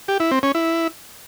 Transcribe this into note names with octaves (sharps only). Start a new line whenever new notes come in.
G4
E4
C4
C#4
E4